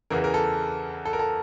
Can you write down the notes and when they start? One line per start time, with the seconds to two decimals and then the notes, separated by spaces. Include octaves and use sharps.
0.10 E2 C#3 E3 A#4
0.24 A#4
0.34 A4
1.05 A4
1.13 A#4
1.19 A4